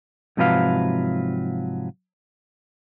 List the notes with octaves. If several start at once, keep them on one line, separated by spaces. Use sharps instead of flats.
G#2 C3 F3 F#3 B4 F5